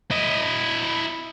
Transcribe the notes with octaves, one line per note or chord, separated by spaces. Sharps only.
E4 D#5